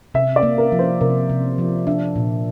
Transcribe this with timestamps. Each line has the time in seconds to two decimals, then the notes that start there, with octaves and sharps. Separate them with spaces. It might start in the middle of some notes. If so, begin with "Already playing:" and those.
0.14 C3 E5
0.36 D5
0.43 A#3
0.58 A#4
0.72 F3
0.79 C5
1.01 C3 A#4
1.30 C3
1.58 F3
1.87 D4 E5
2.16 A#2